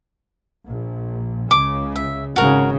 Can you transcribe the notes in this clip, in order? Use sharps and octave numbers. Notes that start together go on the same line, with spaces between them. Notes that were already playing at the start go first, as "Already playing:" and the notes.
A#1
C#2 C#3 D6
E5
G#1 C#3 F#4 A#4